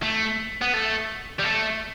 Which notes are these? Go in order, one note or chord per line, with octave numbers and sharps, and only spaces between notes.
A3
B3
A3
G3
A3